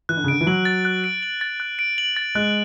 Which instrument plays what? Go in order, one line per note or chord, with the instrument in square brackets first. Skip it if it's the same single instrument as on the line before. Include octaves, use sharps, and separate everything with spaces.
[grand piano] E3 [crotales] F#6
[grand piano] D3
C#3
[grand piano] D3 [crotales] D7
[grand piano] E3
[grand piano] F#3 [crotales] F#7
[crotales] A6
F#6
D7
F#7
A6
F#6
D7
F#7
A6
[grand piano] G#3 [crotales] F#6